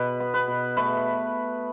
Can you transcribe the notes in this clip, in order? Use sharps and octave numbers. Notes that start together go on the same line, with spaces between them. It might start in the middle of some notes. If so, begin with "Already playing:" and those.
Already playing: B2 B4
B3
B4
B2
A3 B4